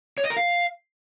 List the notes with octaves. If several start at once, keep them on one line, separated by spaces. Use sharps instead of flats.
C#5
D#5
A#4
F5